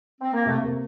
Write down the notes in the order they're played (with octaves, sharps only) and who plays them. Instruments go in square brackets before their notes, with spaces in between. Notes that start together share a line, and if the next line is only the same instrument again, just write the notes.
[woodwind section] C4
A#3
[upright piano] C3 [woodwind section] A3
[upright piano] A#3